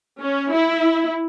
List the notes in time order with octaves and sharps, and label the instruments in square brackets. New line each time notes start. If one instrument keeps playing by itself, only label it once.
[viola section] C#4
E4